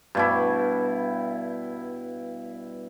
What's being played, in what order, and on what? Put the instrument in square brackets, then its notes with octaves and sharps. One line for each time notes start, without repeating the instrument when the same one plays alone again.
[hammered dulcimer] G2 B2 E4